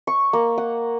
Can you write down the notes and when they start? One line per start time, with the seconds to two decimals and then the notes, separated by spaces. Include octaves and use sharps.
0.07 C#6
0.33 A#3
0.58 F#5